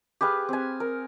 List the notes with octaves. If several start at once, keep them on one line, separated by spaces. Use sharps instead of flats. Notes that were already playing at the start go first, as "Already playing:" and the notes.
G4 G#4 B4 F5
C4 G#5
A#4